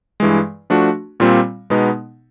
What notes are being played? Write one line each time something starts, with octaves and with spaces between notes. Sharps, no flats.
G2 E3 G#3
F3 A3 D4 F#4
A#2 G3 C4 F4
B2 G#3 B3 D#4